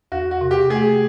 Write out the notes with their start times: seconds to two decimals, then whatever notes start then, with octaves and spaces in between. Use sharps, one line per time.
0.12 E2 F#4
0.31 F#4
0.41 C3
0.51 G4
0.70 A3 G#4